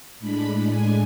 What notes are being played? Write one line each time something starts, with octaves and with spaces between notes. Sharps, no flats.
A2 G#3 D4 B5
G#5